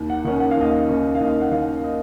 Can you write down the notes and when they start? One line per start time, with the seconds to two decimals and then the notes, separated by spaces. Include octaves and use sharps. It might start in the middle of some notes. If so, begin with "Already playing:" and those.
Already playing: D#2
0.10 F#5
0.25 D#3 A#3 C#4 F#5
0.40 F#5
0.51 F5
0.57 D#2 D#5
0.71 F5
0.89 D#3 A#3 C#4
1.15 F5
1.21 D#2 D#5
1.41 F#5
1.51 D#3 A#3 C#4 F5
1.84 D#5